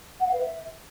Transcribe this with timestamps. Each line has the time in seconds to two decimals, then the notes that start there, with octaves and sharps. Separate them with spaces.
0.20 F#5
0.26 F5
0.33 B4
0.39 E5